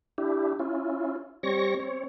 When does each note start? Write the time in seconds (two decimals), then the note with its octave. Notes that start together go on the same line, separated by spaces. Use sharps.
0.18 D4 E4 G4
0.59 C#4 E4 F4
1.43 G3 C4 C#5 C#6 A#6
1.80 C4 C#5